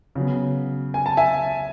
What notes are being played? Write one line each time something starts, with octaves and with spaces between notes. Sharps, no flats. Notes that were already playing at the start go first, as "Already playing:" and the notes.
C#3 F#3 B3
G#5
A5
E5 G#5